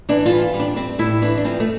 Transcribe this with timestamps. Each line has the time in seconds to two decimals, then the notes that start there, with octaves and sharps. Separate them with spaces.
0.09 E3 D4
0.26 F4
0.31 G3
0.54 G3
0.59 D4
0.76 G3 C4
0.99 A2 E4
1.22 E3 D4
1.37 D4
1.44 F3 C4
1.60 A3